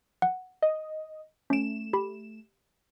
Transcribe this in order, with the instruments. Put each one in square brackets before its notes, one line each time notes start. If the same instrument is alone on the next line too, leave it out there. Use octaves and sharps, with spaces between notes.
[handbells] F#5
[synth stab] D#5
[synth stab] A3 E7 [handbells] C#4 D7
[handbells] G4 B5